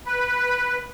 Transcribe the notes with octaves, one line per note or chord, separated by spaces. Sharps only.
B4